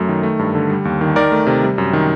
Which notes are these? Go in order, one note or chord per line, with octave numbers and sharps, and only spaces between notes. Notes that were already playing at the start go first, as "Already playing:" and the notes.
Already playing: F#2 F#3 A3
D#3
A3
G2
D3
G3
D#2
D#3
D#3 A#4 D5
A3
C3
G3
F#2
D#3